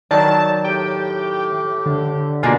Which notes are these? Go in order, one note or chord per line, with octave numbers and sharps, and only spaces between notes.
D#3 F#3 D5 A5
A2 G4 G5
D3
B2 A#3 D4 F4 F#4 G#4